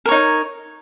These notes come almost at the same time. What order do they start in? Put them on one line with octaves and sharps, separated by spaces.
A#4 C#5 D#4